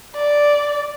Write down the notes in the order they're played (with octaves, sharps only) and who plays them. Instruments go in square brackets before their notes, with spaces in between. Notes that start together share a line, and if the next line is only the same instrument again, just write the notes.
[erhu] D5